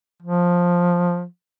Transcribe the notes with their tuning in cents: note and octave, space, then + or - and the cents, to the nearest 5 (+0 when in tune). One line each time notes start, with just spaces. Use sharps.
F3 +10